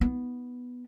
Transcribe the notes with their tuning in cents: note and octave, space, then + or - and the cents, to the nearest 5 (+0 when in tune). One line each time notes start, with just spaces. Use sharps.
B3 +0 D#4 +45